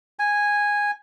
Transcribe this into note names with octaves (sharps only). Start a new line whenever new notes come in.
G#5